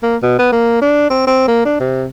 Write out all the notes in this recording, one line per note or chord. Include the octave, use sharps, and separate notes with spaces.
A#3
B2
B3
A#3
D4
C4
C4
A#3
D4
C3